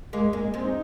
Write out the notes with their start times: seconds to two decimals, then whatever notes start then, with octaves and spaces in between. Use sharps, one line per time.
0.13 G#3 A#3
0.33 G#3 A#3
0.54 G#3 C4
0.64 D#4